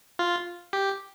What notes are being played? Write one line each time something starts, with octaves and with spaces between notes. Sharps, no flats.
F4
G4